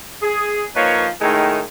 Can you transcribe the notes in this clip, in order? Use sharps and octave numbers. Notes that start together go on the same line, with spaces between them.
G#4
F3 A#3 D#4 B4 C#5
A2 D#3 G#3 A3 D#4